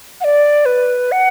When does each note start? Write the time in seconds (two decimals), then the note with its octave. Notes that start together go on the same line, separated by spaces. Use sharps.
0.21 F#5
0.24 D5
0.66 B4
1.12 F#5